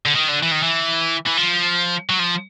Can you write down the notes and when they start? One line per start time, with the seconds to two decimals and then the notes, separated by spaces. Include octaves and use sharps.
0.06 D3
0.15 D#3
0.28 D3
0.43 E3
0.52 D#3
0.63 E3
1.26 E3
1.38 F3
2.10 F#3
2.19 F3